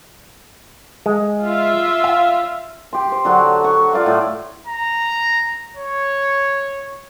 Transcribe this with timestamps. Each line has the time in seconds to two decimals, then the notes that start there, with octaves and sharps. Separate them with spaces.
1.06 G#3
1.44 F4 E5
2.04 F5
2.93 G4 C6
3.12 C5
3.25 D3 F#3 D4 F#4
3.64 C#6
3.93 F4 D5 F5 F#5
4.06 A2
4.67 A#5
5.76 C#5